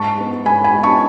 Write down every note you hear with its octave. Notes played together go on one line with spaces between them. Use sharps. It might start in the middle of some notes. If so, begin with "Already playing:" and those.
Already playing: G#2 A5 C#6
G#3 B3
G#2 G#5 B5
G#5 B5
G#3 B3
A5 C#6